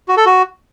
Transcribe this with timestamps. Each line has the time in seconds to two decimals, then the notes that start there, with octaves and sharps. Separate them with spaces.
0.08 F#4
0.17 A4
0.26 F#4